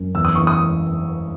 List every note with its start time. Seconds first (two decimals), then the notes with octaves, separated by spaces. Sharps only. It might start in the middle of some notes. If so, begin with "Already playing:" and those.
Already playing: F#2
0.15 E2 E6
0.25 D#6
0.35 E2 C#6
0.47 D#6